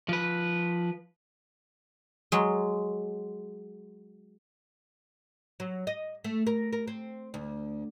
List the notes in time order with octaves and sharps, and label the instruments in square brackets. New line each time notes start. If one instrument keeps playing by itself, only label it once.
[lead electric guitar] F3 B4
[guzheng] F#3 G#3
[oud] F#3
D#5
A3
A#4
A#4
C4
D2